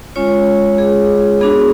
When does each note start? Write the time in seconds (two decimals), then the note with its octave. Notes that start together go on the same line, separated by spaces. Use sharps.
0.16 G#3 C#4 F4 C#5
0.78 G#4
1.41 B3 D4 F#4 G#4